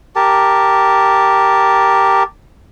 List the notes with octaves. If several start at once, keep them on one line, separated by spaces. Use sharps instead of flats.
G4 A#4 A5